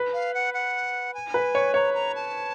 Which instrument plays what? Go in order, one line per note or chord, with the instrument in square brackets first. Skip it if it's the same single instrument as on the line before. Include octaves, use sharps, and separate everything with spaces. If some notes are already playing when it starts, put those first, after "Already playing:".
Already playing: [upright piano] B4
[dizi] F5
F#5
F#5
G#5
[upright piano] B4
C#5
[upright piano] C#5 [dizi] A#5
[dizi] A#5
A5